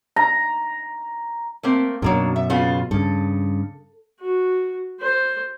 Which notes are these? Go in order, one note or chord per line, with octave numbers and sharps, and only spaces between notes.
A#5
A3 A#3 C4
F#2 B2 F#3 A#3 D4
E5
C#3 B3 F4
G2 C#3 A4
F#4
C5